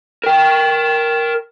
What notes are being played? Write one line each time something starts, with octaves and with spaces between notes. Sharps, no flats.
A#4 G5